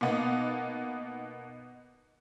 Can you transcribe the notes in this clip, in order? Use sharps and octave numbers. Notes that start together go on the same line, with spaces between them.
B2 A#3 B3 D#4